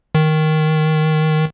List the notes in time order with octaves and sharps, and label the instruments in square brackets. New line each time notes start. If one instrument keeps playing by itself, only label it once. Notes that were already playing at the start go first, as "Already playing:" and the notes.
[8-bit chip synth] D#3